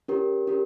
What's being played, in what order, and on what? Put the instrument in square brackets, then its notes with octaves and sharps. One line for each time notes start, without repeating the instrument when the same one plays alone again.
[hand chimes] C#4 G4 A#4
C#4 G4 A#4